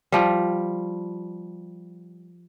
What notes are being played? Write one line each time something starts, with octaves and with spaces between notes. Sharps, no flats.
F3 G3